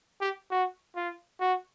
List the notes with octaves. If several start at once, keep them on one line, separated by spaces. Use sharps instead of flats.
G4
F#4
F4
F#4